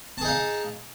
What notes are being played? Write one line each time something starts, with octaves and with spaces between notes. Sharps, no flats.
D#4 G#4 F5 A5